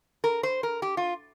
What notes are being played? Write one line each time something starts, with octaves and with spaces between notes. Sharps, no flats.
A#4
C5
A#4
G4
F4